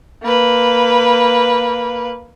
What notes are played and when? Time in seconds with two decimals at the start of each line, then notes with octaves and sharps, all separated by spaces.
0.24 A#3 B4